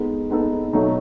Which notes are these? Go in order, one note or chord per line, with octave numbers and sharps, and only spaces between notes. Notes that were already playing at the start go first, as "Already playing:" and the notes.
Already playing: G#3 B3 D#4 A4
G#3 B3 D#4 A4
B2 F#3 A3 D#4